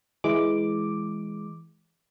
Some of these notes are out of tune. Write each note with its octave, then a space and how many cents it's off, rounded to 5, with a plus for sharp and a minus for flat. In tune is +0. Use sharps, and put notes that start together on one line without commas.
E3 +0 G#3 +5 D6 +0